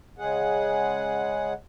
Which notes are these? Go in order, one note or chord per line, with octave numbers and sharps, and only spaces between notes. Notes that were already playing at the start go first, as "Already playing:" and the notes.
C#3 G#3 G#4 F#5